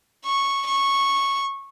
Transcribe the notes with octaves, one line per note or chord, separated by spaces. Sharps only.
C#6
C#6